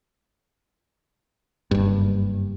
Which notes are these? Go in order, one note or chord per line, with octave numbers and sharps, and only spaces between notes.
F#1 G2